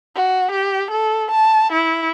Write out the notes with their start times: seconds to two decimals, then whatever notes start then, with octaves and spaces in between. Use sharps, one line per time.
0.16 F#4
0.52 G4
0.91 A4
1.32 A5
1.73 E4